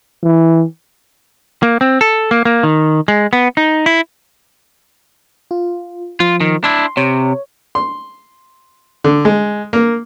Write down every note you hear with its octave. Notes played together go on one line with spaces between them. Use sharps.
E3
A#3
C4
A4
A#3
A#3
D#3
G#3
B3
D#4
E4
F4
F3 F4
D#3
D4 E4 C6
C3 C#5
C6
D3
G#3
A#3